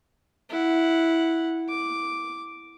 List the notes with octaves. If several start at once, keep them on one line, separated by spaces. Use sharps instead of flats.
E4 F#5
D6